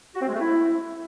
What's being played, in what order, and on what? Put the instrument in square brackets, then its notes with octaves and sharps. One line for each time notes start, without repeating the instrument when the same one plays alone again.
[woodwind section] F#4
C4
G#3
A3
E4